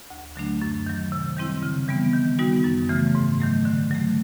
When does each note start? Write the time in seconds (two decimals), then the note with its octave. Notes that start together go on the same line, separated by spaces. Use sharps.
0.10 D2
0.36 D3 F#3 A3 D4
0.62 F#2
0.87 D#3 F#3
1.12 C3
1.37 D#3 G3 C4 E4
1.63 C#3
1.88 E3 G3 B3
2.13 D#3
2.39 G3 B3 D#4 F#4
2.64 F#2
2.89 C#3 E3 A3
3.15 G#2
3.40 D#3 F#3 A3
3.65 D3
3.91 F#3 A3